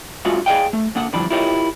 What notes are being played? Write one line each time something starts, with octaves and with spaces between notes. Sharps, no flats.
G#3 D4 F4 F#4 E5 F5
G#4 B4 D5 D#5 F5 G5
A3
D3 A#3 D4 F#5
G2 D3 E3 F3 D4 B5
E4 F4 G4 A#4 C#5 D#5